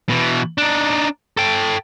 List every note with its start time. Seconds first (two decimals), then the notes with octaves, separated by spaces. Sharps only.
0.09 B2 E3
0.58 D4 D#4
1.37 A4 G5